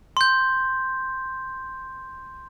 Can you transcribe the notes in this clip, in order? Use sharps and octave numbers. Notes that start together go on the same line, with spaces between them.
C6 G6